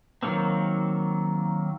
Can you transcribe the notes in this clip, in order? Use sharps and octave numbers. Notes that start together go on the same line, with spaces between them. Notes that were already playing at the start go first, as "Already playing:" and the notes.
D#3 F#3 A#3 C4